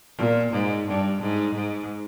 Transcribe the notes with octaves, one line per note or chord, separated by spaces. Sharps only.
A#2
G#2
G2
G#2
G#2